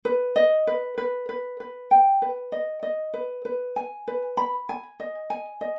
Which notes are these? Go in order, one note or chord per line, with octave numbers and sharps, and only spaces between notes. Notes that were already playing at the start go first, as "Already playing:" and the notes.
B4
D#5
B4
B4
B4
B4
G5
B4
D#5
D#5
B4
B4
G#5
B4
B5
G#5
D#5
G#5
D#5